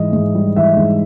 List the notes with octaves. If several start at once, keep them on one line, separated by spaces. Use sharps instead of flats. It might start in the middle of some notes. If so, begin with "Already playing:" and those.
Already playing: G#2 E3 D#5
G#2
G3
E3 E5
G#2